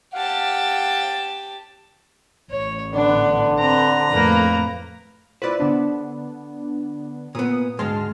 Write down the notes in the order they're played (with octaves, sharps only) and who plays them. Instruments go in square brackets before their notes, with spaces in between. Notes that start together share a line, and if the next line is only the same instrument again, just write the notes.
[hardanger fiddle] G4 A5 [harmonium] F5 F#5
[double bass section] A1 [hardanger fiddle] C#5
[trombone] D3 [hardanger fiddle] B3 [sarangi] D4
[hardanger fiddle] C4 B4 [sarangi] A#5
[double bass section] F2 A2 A3 [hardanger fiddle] A#3 B4
[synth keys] E4 F4 B4 [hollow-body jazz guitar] C5 D5
[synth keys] D3 B3 D4
[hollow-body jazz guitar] A#2 B3 [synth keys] D#6
[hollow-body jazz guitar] D2 G#2 G#3 [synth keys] A5 C6 F6